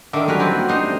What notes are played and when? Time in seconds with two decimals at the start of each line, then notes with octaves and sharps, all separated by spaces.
0.13 D3 D#3 A#4 E5 D6
0.28 F#3 G3 C#4 A#4 B4
0.40 E3 C4 E4
0.54 A#3 F#4
0.68 D4 D#4 C5
0.81 G3 A3 C4